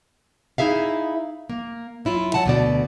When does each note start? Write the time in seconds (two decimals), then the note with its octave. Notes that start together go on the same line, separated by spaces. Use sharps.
0.58 D#4 E4 G#4 E5 F5
1.49 A#3
2.05 F#3 E4 F4
2.34 F#3 F#5 A5
2.46 D2 B2 D5